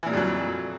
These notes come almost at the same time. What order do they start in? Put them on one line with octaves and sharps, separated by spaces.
E3 A#2 G3 F2 F#3